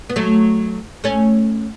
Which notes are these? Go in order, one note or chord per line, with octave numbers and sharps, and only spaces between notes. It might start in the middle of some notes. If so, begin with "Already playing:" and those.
B3
F#3 A3
A3 C#4